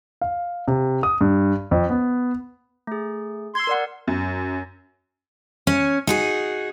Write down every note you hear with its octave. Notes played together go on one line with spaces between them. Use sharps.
F5
C3
D#6
G2
F2
B3
A3 G#4
C6 E6 G#6
A#4 D5 F#5
F#2
C#4 C#5
D#4 F#4 G#4